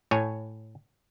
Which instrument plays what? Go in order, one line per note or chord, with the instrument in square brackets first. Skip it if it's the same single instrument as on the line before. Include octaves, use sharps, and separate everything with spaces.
[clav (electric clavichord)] A2 C#5 G#5